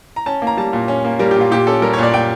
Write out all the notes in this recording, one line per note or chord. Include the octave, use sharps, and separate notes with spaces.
A#5
C#4 A5
A#3
A#5
G3 A5
A#2
C#4
A#3
G3 A#4
G4
A#2 F4
A#2 G4
C#4 A4
G3 A#4
C#5
A#2 D5
A#2 G5